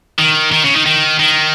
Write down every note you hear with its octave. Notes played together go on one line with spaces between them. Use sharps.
D#3
D#3
C#3
D#3
D#3
D#3